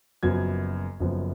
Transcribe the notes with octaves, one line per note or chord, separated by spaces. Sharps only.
F#1 F#2 F3 B3 G#6
F#1 F#2 F3 B3